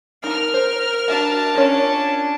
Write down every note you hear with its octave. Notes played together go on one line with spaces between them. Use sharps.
D#4 A#4 A5 F6
C5
D4 F#4 E5 F#5 A5
C#4 F4 A#4 C#5